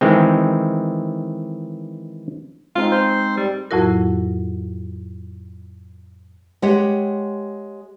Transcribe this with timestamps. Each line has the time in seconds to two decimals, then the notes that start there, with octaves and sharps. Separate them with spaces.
0.01 D#3 E3 G#3 C4
2.75 G#3 C4 D#4 F4
2.92 C5
3.37 G3
3.71 F2 A2 F#3 E4 F#4 A#4
6.62 G#3 G4 C#5 F#5